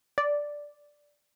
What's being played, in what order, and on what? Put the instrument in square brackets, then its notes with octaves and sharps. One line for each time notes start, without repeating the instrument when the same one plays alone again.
[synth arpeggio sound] D5